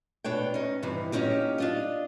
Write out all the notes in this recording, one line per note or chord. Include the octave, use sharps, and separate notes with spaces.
B2 D4 C#5 G5
C#4 D#4
G2 C3 D#3 E3
F#3 A#3 C#4 D#4 G4
D4 F4 D#5